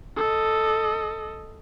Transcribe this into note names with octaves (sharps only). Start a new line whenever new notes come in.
A4 D#5